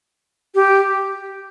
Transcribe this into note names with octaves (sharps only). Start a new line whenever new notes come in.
G4